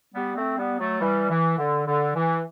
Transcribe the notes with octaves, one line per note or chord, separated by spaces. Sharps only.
G3 B3
A3 C4
G3 B3
F#3 A3
E3 G3
E3
D3
D3
E3